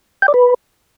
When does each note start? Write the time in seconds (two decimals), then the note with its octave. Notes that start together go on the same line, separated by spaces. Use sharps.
0.22 G5
0.28 D5
0.34 B4